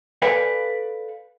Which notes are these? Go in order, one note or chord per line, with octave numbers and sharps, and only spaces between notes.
A4 B4 D5 F5 G5 G#5